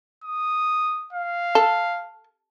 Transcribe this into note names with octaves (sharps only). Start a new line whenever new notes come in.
D#6
F5
A4